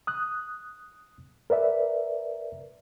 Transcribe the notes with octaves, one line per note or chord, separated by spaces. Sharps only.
D#6 F#6
A#4 B4 D5 E5